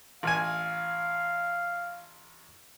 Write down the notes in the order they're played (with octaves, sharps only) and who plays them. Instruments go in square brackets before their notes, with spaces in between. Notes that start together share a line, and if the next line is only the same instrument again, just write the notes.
[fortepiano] A1 G#5 [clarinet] F5